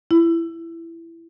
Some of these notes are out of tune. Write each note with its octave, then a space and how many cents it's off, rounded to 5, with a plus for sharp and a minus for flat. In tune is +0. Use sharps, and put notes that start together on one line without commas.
E4 +15